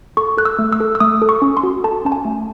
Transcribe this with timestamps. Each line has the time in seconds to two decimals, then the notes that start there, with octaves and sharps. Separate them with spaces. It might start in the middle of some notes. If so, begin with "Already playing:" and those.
0.17 A4 C#6
0.38 A4 F#6
0.45 E6
0.59 A3
0.73 E6
0.80 A4
0.95 E6
1.00 A3 D#6
1.22 A4
1.29 C#6
1.42 C#4
1.57 C6
1.63 F#4
1.84 A4 A5
2.05 C#4 A5
2.12 G#5
2.25 A3